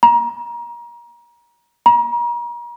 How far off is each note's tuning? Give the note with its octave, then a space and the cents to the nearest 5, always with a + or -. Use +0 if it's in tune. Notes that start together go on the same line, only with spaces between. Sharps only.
A#5 +30
A#5 +40